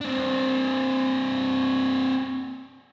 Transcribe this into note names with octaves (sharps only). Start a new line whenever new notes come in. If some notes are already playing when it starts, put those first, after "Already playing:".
C4 D4